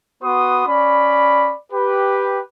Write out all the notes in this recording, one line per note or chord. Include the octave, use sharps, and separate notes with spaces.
B3 F#4 B4 C6 D#6
C#4 D5 B5
G4 B4